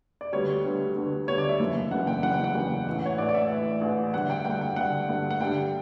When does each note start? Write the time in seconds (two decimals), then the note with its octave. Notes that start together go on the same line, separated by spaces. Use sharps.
0.21 D5
0.33 D2 D3 G3 B3 C#5
0.65 D2 D3 G3 B3
0.96 D2 D3 G3 B3
1.28 D2 D3 G3 B3 C#5
1.38 D5
1.49 E5
1.60 F#1 E2 C#3
1.91 F#1 E2 C#3 F#5
2.07 G5
2.23 F#1 E2 C#3 F#5
2.34 G5
2.44 F#5
2.55 F#1 E2 C#3
2.87 A1 A2 E3
3.06 C#5
3.18 A1 A2 E3 D5
3.29 D5
3.34 E5
3.50 A1 A2 E3
3.81 A1 A2 E3
4.14 G2 D3 A3 F#5
4.30 G5
4.45 G2 D3 A3 G5
4.61 G5
4.76 G2 D3 A3 F#5
5.09 G2 D3 A3
5.31 F#5
5.40 G2 D3 G3 D4 G5